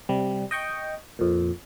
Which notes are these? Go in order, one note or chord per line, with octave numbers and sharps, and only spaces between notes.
C3 G3
D#5 G5 C#6
F2 A#2